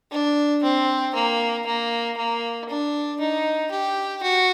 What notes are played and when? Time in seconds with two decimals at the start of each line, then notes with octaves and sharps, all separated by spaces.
0.11 D4
0.63 C4
1.15 A#3
1.66 A#3
2.17 A#3
2.69 D4
3.20 D#4
3.71 G4
4.23 F#4